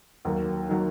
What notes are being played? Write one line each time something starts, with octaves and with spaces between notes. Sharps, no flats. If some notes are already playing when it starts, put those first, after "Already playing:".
D#2 D#3 F#3 A#3
D#3 F#3 A#3